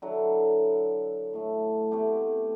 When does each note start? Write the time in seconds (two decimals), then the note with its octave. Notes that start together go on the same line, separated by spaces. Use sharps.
0.02 D3 F#3 E4
1.33 A2 A3
1.92 A3 B3 C4 G4